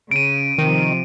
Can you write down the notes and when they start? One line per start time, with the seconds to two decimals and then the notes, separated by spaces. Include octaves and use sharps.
0.11 C#3 D7 D#7
0.58 C3 D#3 F3